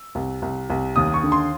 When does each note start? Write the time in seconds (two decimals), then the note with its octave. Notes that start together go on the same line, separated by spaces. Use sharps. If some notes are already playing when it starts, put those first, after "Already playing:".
Already playing: E6
0.15 C2
0.42 C2
0.70 C2
0.96 D#2 D#6
1.14 C#6
1.23 D3
1.32 C6